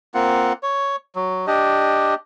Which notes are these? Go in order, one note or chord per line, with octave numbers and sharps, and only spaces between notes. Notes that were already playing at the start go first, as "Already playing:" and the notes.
A#3 C4 F4 F#5
C#5
F#3
D4 G4 D#5